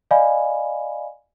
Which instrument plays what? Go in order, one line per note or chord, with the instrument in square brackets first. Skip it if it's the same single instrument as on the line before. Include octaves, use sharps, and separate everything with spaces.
[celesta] D5 D#5 F5 G#5 B5